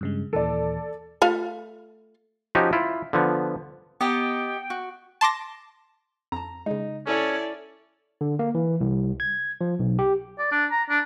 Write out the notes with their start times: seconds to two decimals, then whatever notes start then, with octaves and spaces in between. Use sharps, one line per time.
0.01 G2 C#3 G#3
0.33 D#2 A#2 E3 A4 D5
1.22 A3 F4 F5
2.55 F3 C#4 D#4 F#4 G4
2.73 E4 F4
3.13 D3 F3 B3
4.01 B3 G4 D#5 G5 A#5
4.70 F#4
5.21 A5 C6 D6 A#6
6.32 F2 A5 A#5
6.66 C#3 G#3 D#4
7.07 C#4 E4 A4 C#5 D5
8.21 D3
8.39 A#3
8.55 E3
8.81 C2
9.20 G#6
9.61 F3
9.79 B1
9.99 G4
10.39 D5
10.51 D4
10.71 A#5
10.90 D4